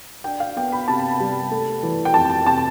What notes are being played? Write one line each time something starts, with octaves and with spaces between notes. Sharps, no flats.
D4 G5
F5
B3 G5
B5
C3 A5
G3
A3
E3
G5
F2 A5
G5
C3 A5